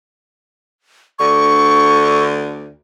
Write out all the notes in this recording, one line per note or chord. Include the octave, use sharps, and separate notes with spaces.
D2 D3 C#6